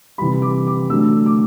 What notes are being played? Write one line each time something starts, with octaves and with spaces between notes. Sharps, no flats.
C3 E3 G3 B5
D6
D6
D3 F#3 A3 E6
D6